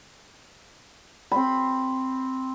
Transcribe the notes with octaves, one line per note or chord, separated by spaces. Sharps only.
C4 B5